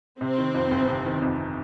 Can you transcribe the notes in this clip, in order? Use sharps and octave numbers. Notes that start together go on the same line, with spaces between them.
C3 C4
D#3
F2
G1
C3
D#3
F2